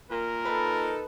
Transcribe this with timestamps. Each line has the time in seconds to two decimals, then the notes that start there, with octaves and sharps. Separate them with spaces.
0.11 A#2 A#4
0.45 D#4 A4 B4